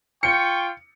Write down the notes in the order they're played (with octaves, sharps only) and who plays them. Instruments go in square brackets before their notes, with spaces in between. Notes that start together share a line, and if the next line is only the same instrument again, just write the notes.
[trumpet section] F4 G5 C#6 [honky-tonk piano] C#7